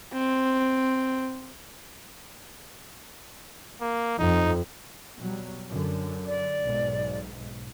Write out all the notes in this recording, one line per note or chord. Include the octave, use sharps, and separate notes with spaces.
C4
A#3
F2 D#4
B2 F#3 G3
F#2 D3
D5
B1 G#2